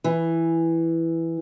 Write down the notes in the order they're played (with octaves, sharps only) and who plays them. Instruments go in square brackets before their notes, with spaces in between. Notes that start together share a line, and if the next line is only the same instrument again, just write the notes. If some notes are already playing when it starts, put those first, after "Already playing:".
[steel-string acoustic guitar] E3